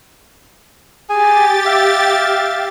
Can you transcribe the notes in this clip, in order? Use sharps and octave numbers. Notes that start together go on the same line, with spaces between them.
G4 G#4 G#5 A6
E5 F5